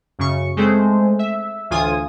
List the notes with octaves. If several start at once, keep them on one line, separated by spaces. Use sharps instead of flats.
F#2 C#3 C#6
G#3 A3 C4 G#4 C5
E5
D2 A2 E3 F4 G#5 D#6